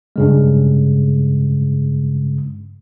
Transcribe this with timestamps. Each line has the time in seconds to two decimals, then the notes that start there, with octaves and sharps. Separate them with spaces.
0.16 G2 C#3 G#3